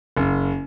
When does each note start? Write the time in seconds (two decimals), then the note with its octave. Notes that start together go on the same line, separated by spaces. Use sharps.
0.17 F#1